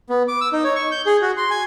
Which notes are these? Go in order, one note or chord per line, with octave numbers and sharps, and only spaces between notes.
B3
D6
E6
D#4
C#5
C#6
G6
G#4
F#4
C6
G#5